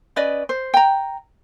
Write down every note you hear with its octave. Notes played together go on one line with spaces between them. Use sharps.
C#4 B4 D5 D#5
C5
G5 A#5